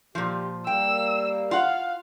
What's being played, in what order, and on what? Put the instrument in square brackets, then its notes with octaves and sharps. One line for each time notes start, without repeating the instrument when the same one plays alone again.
[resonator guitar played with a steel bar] A#2 F3 [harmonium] G4
[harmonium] G3 A#3 [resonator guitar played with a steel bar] G5 [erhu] E6
[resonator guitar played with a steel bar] F4 F#5 [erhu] F5